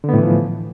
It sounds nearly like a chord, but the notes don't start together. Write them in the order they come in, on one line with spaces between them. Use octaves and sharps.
D3 B3 A2 E3 F3